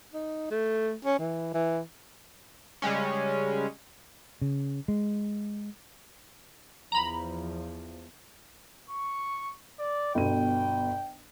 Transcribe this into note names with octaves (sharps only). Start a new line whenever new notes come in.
D#4
A3
C#4
E3
E3
C#3 G3 G#3 C#4
C#3
G#3
E2 F3 A#5 B5
C#6
D5
G1 B2 G5 D#7